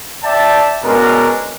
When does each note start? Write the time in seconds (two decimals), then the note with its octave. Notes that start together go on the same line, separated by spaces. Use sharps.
0.24 D5 E5 G5 A5
0.84 B2 G#3 C#4 D4 A#4